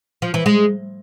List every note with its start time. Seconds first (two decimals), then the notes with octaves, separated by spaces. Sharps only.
0.22 F3
0.34 E3
0.46 G#3